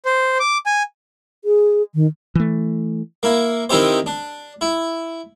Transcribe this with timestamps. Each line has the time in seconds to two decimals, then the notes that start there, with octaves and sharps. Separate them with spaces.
0.05 C5
0.40 D6
0.66 G#5
1.45 G#4
1.95 D#3
2.35 E3 A3
3.23 A#3 E4
3.70 D#3 C4 D#4 E4 G4 C5
4.06 D4
4.61 E4